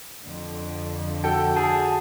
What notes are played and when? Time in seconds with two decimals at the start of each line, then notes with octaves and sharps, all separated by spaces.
0.23 F2 D3
1.24 F#4 A4 G5
1.56 G#4 A5